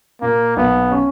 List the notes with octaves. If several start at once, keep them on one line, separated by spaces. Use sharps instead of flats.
A#2 A#3
B1 B3
C#4